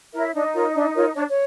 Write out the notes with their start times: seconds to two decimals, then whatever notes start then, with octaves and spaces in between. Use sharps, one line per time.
0.13 E4 A#4 C#5 E5
0.33 D4 D#4 D#5
0.53 F4 A#4 C#5
0.74 D4
0.94 F4 A#4 C#5
1.15 D4 C#5
1.30 C#5